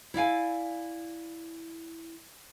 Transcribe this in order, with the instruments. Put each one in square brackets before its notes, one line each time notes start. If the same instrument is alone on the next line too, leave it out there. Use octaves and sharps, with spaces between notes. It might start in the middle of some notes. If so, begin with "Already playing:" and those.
[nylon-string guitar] E4 D5 F5 G#5